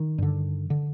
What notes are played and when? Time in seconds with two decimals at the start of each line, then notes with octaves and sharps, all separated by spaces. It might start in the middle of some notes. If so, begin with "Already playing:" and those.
Already playing: D#3
0.18 G2 D3
0.70 D3